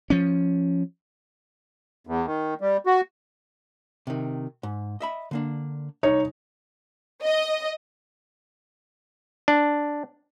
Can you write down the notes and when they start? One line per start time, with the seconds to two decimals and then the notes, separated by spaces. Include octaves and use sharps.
0.10 F3 C#4
2.07 E2
2.26 D#3
2.61 G3
2.86 F#4
4.07 C3 D#3
4.63 G#2
5.00 D#5 E5 B5
5.31 D3 A#3 D4
6.03 C2 D#4 C#5
7.23 D#5
9.48 D4